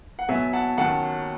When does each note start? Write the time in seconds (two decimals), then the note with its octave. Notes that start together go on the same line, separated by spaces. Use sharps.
0.19 F#5
0.29 B2 F#3 B3 E5 G#5
0.53 F#5 A5
0.77 D#2 D#3 F#3 C#4 F#5 A5